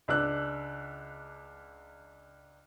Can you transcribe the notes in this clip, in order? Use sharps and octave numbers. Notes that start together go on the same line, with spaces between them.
C#2 D4 E6 F#6